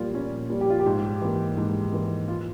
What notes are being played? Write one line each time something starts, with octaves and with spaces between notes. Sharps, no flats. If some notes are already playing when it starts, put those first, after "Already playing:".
Already playing: A#2 G3 A#3 F4
A#2 C#4
G3 A#3
G4
F4
G4
G#2
E3 A#3
G#2
E3 A#3
F4